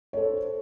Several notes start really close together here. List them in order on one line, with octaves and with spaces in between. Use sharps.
C#5 A4 C5